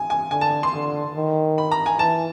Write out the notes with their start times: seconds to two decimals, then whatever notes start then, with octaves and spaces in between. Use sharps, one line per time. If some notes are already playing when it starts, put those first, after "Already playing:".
Already playing: G#5
0.10 G#5
0.31 D3 G#5
0.41 A5
0.63 C6
0.74 D3
1.16 D#3
1.58 B5
1.71 A#5
1.86 G#5
1.99 E3 A5